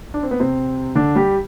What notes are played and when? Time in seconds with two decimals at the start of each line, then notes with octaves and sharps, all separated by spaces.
0.14 D4
0.23 C4
0.31 B3
0.40 C3 C4
0.95 D3 D4
1.16 G3 G4